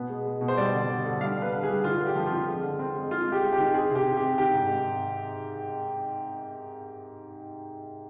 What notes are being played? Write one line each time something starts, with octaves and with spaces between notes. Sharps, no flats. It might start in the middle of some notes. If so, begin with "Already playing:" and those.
Already playing: B2 B3
G#3
G#3
B2
C5
G3 D5
D3
D3
D3
G3 F5
D4
B4
D3
G#4
G3
D3 F4
D3
G4
F3
F4
C4
G#3
D3
C4
G#3
G#3 F4
G#3
G4
G#3
G4
D#3
C4 G#4
C3 G4
C4
G4
C3
D#3 G4
G#2